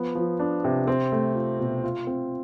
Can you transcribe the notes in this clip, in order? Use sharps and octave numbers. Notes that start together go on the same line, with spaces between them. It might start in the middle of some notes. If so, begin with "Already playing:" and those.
Already playing: F3 B3
F3
D4
C3
C4
A3
F4
B2
F4
C4